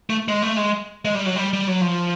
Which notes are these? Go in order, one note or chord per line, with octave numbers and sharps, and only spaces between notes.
A3
G#3
A3
G#3
G#3
G3
F#3
G3
G3
F#3
F3